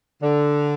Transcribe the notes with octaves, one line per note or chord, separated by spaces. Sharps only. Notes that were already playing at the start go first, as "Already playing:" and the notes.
D3